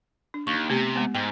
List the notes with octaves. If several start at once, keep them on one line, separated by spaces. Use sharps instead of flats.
D4
D#2 C#6
C3 A3 B3 G4
G#3 B3
G#2 G5